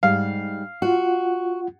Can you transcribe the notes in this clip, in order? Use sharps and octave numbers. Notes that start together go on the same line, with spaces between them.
G#2 G3 F5
F4 F#4 F#5